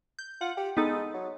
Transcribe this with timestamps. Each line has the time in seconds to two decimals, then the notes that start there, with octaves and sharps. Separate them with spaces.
0.19 G6
0.41 F4 F#5
0.57 G4
0.77 G#3 B3 D#4 A4
1.14 F#3